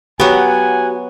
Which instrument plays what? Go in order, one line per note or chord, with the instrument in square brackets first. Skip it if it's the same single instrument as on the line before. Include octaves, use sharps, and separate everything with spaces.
[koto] F#3 B3 [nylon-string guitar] F#4 G4 [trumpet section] F#5 G#5